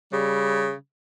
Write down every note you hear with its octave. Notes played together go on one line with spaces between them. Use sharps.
C#3 G3